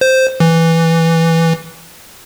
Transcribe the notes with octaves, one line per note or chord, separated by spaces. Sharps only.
C5
E3